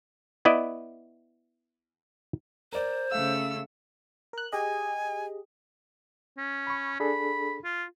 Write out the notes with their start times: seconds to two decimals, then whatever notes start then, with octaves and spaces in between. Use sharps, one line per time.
0.45 B3 E4 D5 D#5
2.73 A#4 C5 D5
3.12 C#3 A3 F5 E6
4.33 A#4 F#6
4.52 G4 G#4 D#5 G#5
6.38 C#4
6.67 B5 C#6
7.00 D4 G#4 A4 B5
7.64 F4